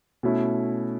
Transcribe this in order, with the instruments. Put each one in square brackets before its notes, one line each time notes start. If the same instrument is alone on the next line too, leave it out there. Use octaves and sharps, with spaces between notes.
[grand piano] B2 A3 C#4 E4